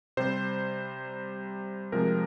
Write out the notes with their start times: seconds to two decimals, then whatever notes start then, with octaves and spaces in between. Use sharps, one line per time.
0.17 C3 G3 C5
1.92 C3 F3 G#3 A#4